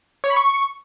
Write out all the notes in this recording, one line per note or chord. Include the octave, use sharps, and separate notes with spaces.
C#5
B5
C#6